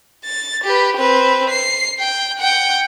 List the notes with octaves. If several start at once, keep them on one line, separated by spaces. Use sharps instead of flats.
A6
G4 B4
C4 B4
C7
G5
F#5 G5